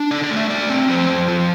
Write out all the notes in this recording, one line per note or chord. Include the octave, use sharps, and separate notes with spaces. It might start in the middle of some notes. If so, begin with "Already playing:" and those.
Already playing: D4
D3 D5
D5
A3
E5
D3 D5
C4
F3 C5
F2
F3